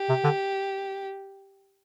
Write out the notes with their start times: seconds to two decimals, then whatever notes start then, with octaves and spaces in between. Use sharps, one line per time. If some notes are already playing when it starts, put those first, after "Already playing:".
Already playing: G4
0.09 C3
0.24 D3